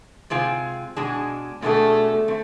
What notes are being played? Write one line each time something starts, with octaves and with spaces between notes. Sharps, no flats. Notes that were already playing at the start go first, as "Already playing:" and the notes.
C3 G#3 C4 F4 G#4
B2 G#3 D4 G#4
B2 G#3 A3 D4 G#4
A3 C4